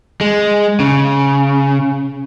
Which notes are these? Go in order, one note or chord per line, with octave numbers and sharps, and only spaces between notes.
G#3
C#3